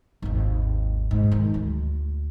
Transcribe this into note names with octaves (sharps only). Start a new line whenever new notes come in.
G#1 D#2
G#2
D#3 G#3
D2